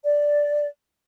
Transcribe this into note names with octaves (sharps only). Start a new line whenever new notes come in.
D5